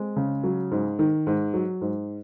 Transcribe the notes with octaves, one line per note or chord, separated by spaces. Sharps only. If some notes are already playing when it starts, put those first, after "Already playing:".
Already playing: G#3 C4
C#3
F#3
G#2
D#3
G#2
F#3
G#2